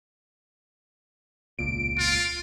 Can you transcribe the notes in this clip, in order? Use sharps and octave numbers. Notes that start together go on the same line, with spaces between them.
E1 C#2 A#2 D7
F4